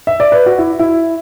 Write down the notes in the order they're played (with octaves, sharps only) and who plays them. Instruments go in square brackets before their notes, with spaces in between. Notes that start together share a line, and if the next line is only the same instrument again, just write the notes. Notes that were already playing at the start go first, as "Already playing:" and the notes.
[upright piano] E5
D5
B4
F#4
E4
E4